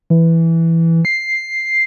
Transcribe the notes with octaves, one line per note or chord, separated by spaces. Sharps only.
E3
C7